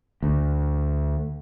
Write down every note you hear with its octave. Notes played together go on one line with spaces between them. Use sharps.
D2